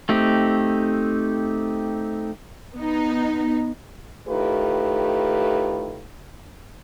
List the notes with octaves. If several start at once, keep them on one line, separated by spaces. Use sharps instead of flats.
A3 C4 D#4 G4
B3 D#4
A2 D#3 A3 F4 G4 B4